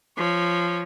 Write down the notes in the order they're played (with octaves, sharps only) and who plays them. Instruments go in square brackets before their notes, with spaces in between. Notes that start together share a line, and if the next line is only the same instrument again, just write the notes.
[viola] F3 C#5